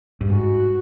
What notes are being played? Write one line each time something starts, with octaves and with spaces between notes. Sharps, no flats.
G2
G#2 F#4